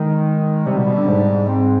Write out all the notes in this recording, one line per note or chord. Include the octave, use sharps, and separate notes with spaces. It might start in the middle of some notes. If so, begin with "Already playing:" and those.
Already playing: D#3 G#3
C3 G3
B2
B2
D3
G#2
C4